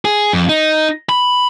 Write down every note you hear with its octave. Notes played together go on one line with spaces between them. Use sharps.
G#4
F2
D#4
B5